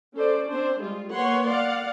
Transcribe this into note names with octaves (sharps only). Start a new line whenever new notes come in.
C#4 A4 C5 D5
C4 D4 C5
G3 G#3 F4
A#3 B4 C#5 F#5 C6
D5 F5 F#5